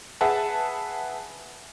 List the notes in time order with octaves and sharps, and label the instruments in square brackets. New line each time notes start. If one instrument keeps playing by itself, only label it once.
[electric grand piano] G#4 B4 E5 F#5 A5